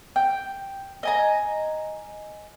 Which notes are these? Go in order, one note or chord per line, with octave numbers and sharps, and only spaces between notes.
G5
D#5 G#5 A#5